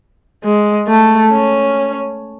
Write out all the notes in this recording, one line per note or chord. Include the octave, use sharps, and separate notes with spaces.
G#3
A3
C#4